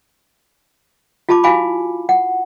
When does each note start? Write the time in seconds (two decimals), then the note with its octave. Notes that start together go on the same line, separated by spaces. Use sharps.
1.29 F4 G4 A5 B5 D6
1.44 E4 F#4 F5 G#5 B5 D6
2.09 F#5